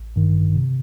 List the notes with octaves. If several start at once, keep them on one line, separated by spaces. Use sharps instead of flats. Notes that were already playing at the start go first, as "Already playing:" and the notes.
Already playing: A1
G2 D#3
C3